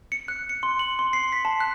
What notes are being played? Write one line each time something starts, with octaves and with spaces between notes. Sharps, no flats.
C#7
F#6
C#7
C6
F#7
C6
C7
B6
A5
F#6